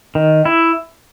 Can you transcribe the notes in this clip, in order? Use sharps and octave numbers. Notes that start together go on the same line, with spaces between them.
D#3
E4